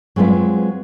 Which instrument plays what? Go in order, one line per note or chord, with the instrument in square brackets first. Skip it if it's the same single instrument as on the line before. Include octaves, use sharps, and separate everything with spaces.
[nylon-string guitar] F#3 G#3 C4 F4 B4